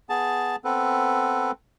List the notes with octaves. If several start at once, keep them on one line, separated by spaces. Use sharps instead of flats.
B3 G#4 A5
B3 C4 A4 B4